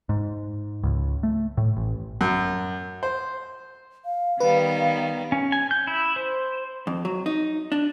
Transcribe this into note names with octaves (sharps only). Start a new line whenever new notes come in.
G#2
C#2
A3
A2
A1
F#2
C5
F5
D#3 G3 B3 B4
C#4
G#5
G6
E4
C5
F2
F#3
D#4
D4